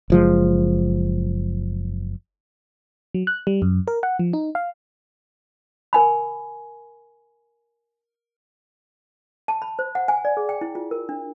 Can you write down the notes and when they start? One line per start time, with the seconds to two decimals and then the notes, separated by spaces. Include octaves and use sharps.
0.10 F#1 F3 G#3
3.14 F#3
3.27 F#6
3.47 G3
3.62 F#2
3.88 A#4
4.03 F#5
4.19 F3
4.33 D#4
4.55 F5
5.93 A#4 G#5 B5
9.48 A5
9.62 B5
9.79 C5
9.95 F#5
10.08 G#5
10.25 D5
10.37 G#4
10.49 G5
10.61 E4
10.75 F4
10.91 A#4
11.09 D4